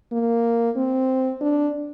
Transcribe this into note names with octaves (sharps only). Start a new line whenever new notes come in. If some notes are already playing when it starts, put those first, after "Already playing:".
A#3
C4
D4